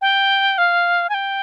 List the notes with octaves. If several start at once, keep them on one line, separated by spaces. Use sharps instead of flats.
G5
F5
G#5
G5